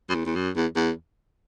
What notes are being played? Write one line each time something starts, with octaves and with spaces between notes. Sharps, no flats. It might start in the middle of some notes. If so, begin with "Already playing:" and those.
F#2
E2
E2
F#2
E2
E2